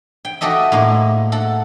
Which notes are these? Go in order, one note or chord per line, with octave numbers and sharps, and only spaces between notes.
G5
F#4 G4 A4 D#5 E5
A2 G#3 A#3
A4 F#5